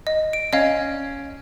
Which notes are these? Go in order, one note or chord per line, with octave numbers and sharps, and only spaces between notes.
D#5
D7
C#4 D#5 F5